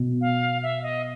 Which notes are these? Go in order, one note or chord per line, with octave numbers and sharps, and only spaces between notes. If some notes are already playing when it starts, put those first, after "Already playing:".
Already playing: B2
F5
E5
D#5